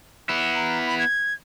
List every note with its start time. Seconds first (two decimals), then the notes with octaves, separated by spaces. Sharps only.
0.29 B3 E4
0.55 A#5
0.87 B5
0.99 G#6